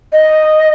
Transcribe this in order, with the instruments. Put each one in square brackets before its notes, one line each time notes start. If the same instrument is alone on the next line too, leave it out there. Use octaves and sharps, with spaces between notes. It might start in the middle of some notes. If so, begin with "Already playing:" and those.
[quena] D#5